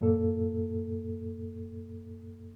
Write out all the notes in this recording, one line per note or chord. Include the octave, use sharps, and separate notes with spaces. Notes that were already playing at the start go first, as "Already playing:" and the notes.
F#2 A#2 A#3 A4